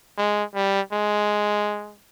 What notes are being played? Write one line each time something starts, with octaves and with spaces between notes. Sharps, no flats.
G#3
G3
G#3